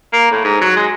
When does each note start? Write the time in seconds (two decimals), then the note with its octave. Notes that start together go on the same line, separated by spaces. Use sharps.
0.13 A#3
0.32 A2
0.44 G#2
0.61 F#3
0.77 G#3